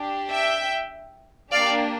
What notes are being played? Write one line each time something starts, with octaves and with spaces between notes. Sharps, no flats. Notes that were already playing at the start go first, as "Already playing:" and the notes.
Already playing: D4 G4
E5 G5
A#3 D4 G4 D5 F5